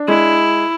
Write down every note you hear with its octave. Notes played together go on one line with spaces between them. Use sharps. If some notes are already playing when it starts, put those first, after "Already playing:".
Already playing: D4
G#3 E4